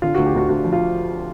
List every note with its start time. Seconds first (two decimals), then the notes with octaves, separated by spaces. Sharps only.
0.02 D3 F4
0.15 D2 F#4
0.26 G4
0.34 D2 F#4
0.49 D2 F#4
0.64 F3
0.73 F4